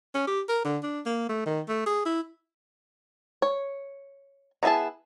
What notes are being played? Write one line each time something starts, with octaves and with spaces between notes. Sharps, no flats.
C#4
G4
A#4
D3
D4
A#3
A3
D#3
A3
G#4
E4
C#5
D#3 B3 E4 G#4 A5